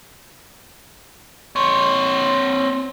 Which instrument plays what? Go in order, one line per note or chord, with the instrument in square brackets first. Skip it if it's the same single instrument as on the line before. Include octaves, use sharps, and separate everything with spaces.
[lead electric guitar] C4 C#5